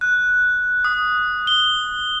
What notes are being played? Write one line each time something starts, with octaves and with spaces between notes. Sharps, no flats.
F#6
D#6
G7